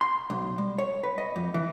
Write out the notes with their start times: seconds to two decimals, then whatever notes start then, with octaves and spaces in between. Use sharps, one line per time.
0.01 C6
0.30 B1
0.58 G3
0.78 C#5
1.03 B4
1.18 D#5
1.36 F2
1.54 E3